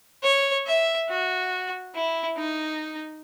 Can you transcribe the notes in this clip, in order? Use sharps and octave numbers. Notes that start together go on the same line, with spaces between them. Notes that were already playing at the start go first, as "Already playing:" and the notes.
C#5
E5
F#4
E4
D#4